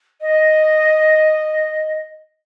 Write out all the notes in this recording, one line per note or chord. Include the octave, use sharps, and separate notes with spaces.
D#5